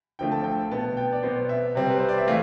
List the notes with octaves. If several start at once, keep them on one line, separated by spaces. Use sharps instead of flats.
D3 F3 A3 C4 G5
A5
G5
B2 B3 A5
G5
D5
B2 B3 C5
E5
C3 G3 C4
B4
C5
D5
E5
E3 A3 F5